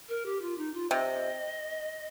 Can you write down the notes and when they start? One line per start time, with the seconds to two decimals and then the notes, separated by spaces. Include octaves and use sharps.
0.09 A#4
0.26 G4
0.42 F4
0.58 D#4
0.74 F4
0.91 C3 D#5